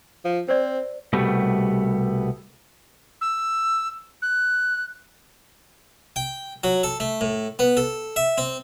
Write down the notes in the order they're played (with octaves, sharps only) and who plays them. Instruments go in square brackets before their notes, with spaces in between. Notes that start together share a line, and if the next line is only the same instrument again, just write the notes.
[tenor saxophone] F3
[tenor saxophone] C4 [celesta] C5 D5
[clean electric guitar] C2 B2 G3 A3 B3
[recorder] E6
F#6
[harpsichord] G5
F#3
A4
A3
A2
B3
A4
E5
C4